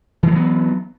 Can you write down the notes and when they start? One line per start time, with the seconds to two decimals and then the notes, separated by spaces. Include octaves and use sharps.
0.23 E3
0.27 G#3
0.32 F#3
0.36 B3